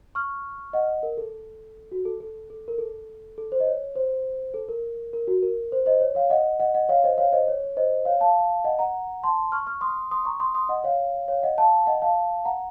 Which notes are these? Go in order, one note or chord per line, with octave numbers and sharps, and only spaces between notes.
C#6 F6
D#5 F#5
A#4
A4
F#4
A4
A4
A4
A#4
A4
A4
C5
D#5
C#5
C5
A4
A#4
A#4
F#4
A#4
C5
C5 D#5
C#5
C#5 F5
D#5 F#5
D#5 F#5
D#5 F#5
C#5 F5
C5 D#5
C#5 F5
C5 D#5
C#5
C5 D#5
C#5 F5
F5 A5
D#5 F#5
F#5 A#5
A5 C6
C#6 F6
C#6 F6
C6 D#6
C6 D#6
A#5 C#6
C6 D#6
C6 D#6
D#5 F#5
C#5 F5
C#5 F5
D#5 F#5
F5 A5
D#5 F#5
F5 A5
F#5 A#5